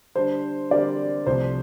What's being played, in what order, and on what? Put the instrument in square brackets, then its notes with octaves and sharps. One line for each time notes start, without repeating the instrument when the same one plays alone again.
[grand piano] D3 G3 D4 [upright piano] C5
[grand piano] D3 G3 C4 G4 A#4 [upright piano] D5
[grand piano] C2 C3 F3 A3 [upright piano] C5